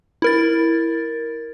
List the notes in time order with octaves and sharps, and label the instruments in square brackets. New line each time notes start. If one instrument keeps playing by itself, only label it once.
[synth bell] E4 A#4 A6